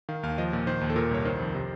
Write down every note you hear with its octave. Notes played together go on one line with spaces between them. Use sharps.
D#3 F5
D#2 F5
F3 D#5
A#2
D#3 C5
D#2
A4
A#2 A#4
C2 C#5
D#3 C5
F2
C3